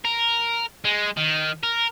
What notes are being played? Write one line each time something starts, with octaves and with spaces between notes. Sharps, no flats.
A#4
G#3
D#3
A#4